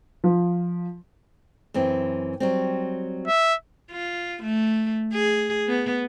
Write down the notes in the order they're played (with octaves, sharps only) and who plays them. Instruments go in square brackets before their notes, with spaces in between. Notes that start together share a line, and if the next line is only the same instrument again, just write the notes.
[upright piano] F3
[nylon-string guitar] F#2 E3 C4
F#3 G3 C4
[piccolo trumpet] E5
[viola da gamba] F4
A3
G#4
B3